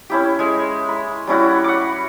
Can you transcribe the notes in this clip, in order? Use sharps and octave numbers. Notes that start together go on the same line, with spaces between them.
C#4 E4 G4
G#3 G#5
B5
G3 C#4 E4 F#4
F#5 D6